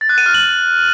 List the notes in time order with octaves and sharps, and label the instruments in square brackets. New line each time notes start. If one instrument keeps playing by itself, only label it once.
[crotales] A6
F#6
D#7
F6
F#7